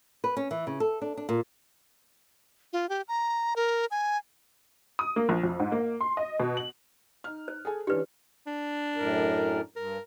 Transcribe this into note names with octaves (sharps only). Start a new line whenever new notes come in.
B4
C#4
E3
C#3
A4
D4
D4
A#2
F4
G4
A#5
A#4
G#5
D#6
A#3
A#1
F2
G#2
A#3
C6
D#5
B2
F#7
D#4 F6
C5
G#4 A4 G#5
E3 C#4 D4 G4 B4
D4
F#2 A2 A#4
G2 A#4